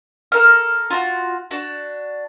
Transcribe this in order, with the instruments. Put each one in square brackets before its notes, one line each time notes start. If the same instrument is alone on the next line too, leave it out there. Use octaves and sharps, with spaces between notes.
[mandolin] A4 A#4 F6
F4 F#4
D4 F#4